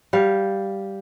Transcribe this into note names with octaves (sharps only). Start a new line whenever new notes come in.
G3 F5